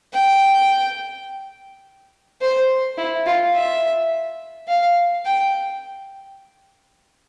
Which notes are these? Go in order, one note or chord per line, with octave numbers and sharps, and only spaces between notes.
G5
C5
E4
F4
E5
F5
G5